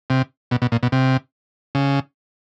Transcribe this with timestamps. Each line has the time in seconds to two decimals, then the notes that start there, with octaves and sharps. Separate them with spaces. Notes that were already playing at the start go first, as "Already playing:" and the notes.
0.10 C3
0.51 B2
0.62 B2
0.72 A#2
0.83 B2
0.92 C3
1.75 C#3